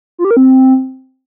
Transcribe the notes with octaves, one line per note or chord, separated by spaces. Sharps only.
F4
G4
A#4
C4